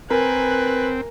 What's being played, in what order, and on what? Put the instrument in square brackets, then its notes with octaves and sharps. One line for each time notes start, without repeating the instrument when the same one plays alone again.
[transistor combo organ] C4 [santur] A#4 [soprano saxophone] B4 [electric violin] G#5 F#6